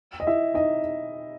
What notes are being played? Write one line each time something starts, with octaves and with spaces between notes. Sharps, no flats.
D#5
E4 E5
D#4 D#5